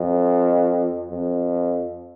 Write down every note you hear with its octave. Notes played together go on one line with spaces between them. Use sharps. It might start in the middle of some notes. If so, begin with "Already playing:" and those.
Already playing: F2
F2